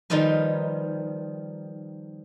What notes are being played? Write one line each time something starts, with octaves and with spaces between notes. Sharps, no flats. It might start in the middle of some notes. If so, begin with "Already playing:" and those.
D#3 F3 G3 D#4 F4 B4